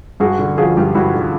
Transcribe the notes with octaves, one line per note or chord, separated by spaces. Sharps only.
G2 F#4 G#4
D3
F3 F#4 G#4
G2 F4 G4
G2 E4 F#4
D3